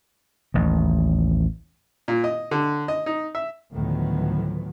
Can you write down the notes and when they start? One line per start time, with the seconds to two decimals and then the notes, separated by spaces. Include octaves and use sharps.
0.54 A1 D#2
2.08 A#2
2.24 D#5
2.51 D3
2.88 D#5
3.06 D#4
3.35 E5
3.73 D2 A2 D#3 F3 F#3 B3